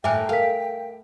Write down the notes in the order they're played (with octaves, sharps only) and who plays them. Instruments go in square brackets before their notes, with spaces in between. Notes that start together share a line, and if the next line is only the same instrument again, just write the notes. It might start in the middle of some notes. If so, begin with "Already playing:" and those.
[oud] D#2 A2 A#4 [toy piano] E5 G#5 [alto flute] G5 [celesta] D6 F#6
[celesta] A4 A#4 B6 [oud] F5